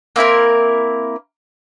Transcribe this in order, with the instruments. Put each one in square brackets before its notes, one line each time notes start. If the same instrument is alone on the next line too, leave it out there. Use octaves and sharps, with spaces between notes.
[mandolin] A#3 C4 E4 A#4